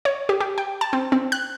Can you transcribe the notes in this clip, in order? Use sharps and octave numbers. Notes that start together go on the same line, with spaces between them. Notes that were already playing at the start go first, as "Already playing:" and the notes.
C#5
G4
G4
G5
A5
C4
C4
F#6